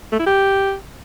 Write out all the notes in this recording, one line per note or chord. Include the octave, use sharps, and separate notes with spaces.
A3
E4
G4